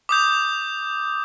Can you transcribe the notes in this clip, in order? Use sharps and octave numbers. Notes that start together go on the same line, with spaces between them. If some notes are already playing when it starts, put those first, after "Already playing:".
D6 D#6 G6